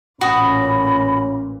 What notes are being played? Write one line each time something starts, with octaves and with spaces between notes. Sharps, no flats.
A1 A#2 C#4 F#4 B5 D#6